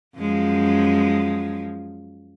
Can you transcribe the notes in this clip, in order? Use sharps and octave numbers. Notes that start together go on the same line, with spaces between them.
F#2 F3 G#3